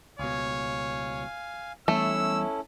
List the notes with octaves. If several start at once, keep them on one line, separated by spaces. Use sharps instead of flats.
C#2 B2 C#5 F5 G#5
E3 G3 A3 B3 C#4 E4 E6